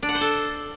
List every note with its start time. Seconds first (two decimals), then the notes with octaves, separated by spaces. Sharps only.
0.03 D4
0.09 F#5
0.15 C5
0.21 A4